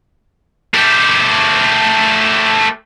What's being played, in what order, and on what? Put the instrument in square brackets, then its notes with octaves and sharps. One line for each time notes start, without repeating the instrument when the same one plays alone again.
[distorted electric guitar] A3 G4